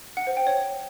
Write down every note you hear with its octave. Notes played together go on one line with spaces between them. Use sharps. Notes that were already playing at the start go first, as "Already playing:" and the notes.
F#5
C5
G5
C#5